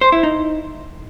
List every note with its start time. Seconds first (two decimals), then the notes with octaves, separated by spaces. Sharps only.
0.01 C5
0.12 E4
0.23 D#4